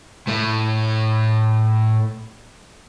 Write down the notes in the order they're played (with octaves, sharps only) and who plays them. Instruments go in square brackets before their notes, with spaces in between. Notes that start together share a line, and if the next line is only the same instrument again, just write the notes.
[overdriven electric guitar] A2 A3